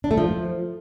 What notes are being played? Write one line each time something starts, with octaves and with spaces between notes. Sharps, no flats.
D4
A3
F3